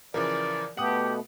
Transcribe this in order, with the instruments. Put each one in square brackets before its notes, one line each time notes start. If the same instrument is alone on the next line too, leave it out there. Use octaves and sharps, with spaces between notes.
[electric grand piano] C#3 E3 F3 [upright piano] A#4 [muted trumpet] D5
[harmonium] B2 A3 B3 [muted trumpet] G4 [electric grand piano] F#5 D#6 [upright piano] F#7